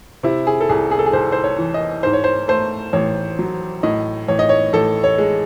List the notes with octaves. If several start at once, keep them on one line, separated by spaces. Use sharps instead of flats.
C3 E4
G#4
A4
C2 G#4
G#4
A4
G#4
C2 C5
C5
C#5
E3
D#5
G#2 C5
C#5
C5
A3 C5
A1 C#5
F#3
A2 D#5
A1 C#5
D#5
C#5
A1 A4
C#5
G#3